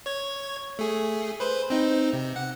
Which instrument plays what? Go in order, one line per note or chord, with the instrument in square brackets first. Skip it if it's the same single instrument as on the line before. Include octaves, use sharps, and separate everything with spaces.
[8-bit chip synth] C#5 G#6
A3 G#4
B4 C5
C4 D#4
C3
F#5